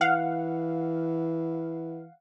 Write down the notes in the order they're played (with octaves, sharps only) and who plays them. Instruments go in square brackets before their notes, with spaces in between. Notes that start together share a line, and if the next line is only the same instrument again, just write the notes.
[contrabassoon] E3 [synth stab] F5 F#5